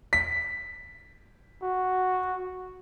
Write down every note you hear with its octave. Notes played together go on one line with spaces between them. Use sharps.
B6
F#4